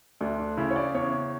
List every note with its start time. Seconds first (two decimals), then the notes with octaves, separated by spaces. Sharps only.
0.21 D2 D4
0.39 D4
0.57 C#3 E4
0.71 C#5
0.76 D5
0.95 E2 C#5